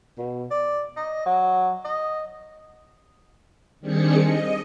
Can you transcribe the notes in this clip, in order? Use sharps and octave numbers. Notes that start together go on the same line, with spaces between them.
B2
D5
D#5
F#3
D#5
D#3 G3 C4 D4 G#4 C#7
D#5